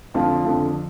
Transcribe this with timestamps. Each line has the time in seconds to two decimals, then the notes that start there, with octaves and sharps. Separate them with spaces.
0.14 F2 D3 F3 F4
0.45 F2 D3 F3